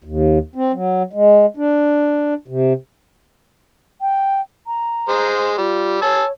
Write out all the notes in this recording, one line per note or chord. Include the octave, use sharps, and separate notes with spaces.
D#2
C4
F#3
G#3
D4
C3
G5
A#5
G#3 C5
G3 F4
C#5 G#5 A5 E6